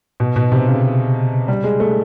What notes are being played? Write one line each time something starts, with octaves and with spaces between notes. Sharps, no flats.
B2
B2
C3
C#3
G3
G#3
A3